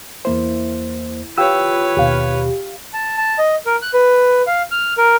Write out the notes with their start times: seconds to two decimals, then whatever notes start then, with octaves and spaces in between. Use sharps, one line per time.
0.25 E2 A#3 E4 C5
1.38 F4 G4 B4 C#5 G5 E6
1.97 D#2 B2 G4 F5
2.94 A5
3.18 A5
3.38 D#5
3.66 A#4
3.82 F#6
3.94 B4
4.47 F5
4.71 F6
4.98 A#4